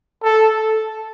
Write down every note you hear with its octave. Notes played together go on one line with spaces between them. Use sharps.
A4